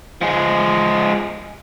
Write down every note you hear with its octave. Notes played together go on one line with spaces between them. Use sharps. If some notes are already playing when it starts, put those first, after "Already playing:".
F3 G#3